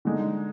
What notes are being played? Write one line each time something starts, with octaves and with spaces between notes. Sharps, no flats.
D3 G#3 D#4